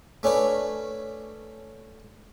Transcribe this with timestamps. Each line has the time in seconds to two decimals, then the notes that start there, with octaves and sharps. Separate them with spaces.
0.23 A3 C#4 D4 B4